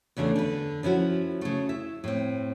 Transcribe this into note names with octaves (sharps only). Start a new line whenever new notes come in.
E2 C#3 A3 D4 G#4
D3 B4
F3 C#4 E4 F#4
C#3 A3
E4 E5
A2 C4